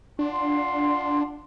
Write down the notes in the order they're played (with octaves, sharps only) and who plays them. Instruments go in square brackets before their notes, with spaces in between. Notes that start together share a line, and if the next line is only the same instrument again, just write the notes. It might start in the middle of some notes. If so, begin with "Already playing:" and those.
[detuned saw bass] D4 [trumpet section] F4 F#5 C6